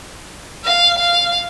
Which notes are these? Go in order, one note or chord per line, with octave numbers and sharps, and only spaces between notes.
F5
F5